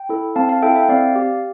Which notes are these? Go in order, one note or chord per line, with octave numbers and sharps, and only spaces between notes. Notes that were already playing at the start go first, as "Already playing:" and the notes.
Already playing: G5
E4 A4
C4 F5 A5
F5 A5
E4 A4 E5 G5
E5 G5
C4 D5 F5
G4